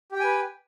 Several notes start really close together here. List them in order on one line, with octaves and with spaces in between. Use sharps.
G4 G5 G#5 B4